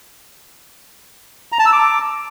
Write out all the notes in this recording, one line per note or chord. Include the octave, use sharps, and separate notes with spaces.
A#5
A5
E6
D6